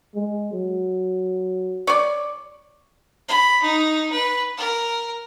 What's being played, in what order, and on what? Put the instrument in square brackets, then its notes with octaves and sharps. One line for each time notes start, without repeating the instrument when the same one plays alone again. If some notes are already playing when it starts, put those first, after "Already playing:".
[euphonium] G#3
F#3
[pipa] C#5 D5
[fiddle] B5
D#4
B4
A#4